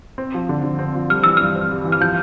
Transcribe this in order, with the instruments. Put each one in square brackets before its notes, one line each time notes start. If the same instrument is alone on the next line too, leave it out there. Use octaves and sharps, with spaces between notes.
[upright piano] C4
F3
D3
D3
C4
F3
[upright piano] G3 [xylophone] F6
[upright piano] E3 [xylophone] E6
[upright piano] G2 [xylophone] F6
[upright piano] C4
G3
E3
[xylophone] F6
[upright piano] F3 [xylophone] G6